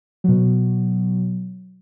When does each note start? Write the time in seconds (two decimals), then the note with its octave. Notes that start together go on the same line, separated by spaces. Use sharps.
0.24 B2 F#3